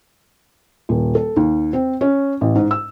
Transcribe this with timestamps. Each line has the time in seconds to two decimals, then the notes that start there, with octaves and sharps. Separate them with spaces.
0.89 D#1
1.15 A4
1.36 D#2
1.73 C4
2.01 C#4
2.41 A1
2.55 G#2
2.71 E6